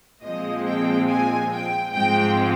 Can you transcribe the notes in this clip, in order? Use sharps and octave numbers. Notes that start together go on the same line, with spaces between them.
A#2 F3 G#3 C4 D#5
G5
G#5
G5
G#2 F3 G#3 C4 G5